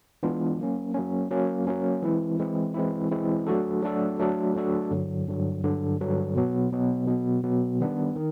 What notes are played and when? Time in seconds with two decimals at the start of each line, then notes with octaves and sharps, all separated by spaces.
0.23 E3 G#3 B3 D4 F4
0.59 F#3 A#3 C#4
0.94 F#3 A#3 C#4
1.31 F#3 A#3 C#4
1.67 F#3 A#3 C#4
2.03 E3 G#3 C4 E4
2.39 E3 G#3 C4 E4
2.74 E3 G#3 C4 E4
3.11 E3 G#3 C4 E4
3.47 F#3 A3 D4 F#4 A4
3.83 F#3 A3 D4 F#4 A4
4.19 F#3 A3 D4 F#4 A4
4.55 F#3 A3 D4 F#4 A4
4.91 G2 D3 F#3
5.27 G2 D3 F#3
5.64 G2 D3 F#3
6.00 G2 D3 F#3
6.35 B2 F#3 B3
6.72 B2 F#3 B3
7.07 B2 F#3 B3
7.44 B2 F#3 B3
7.80 D#3 G3 B3 D4
8.16 D#3